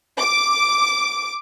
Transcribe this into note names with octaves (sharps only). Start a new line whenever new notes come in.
D6